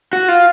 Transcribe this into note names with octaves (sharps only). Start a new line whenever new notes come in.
F#4
F4